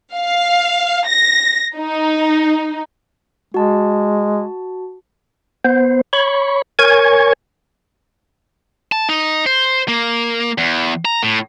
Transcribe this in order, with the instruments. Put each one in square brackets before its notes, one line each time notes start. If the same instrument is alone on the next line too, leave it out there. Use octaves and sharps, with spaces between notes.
[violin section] F5
A#6
D#4
[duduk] G#3 [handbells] F#4 A5
[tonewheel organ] B3 C5
C#5 B5 C#6
A#4 C#5 G#5 C#6 G#6
[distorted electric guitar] A5
D#4
C5
A#3
E2
A#5
A2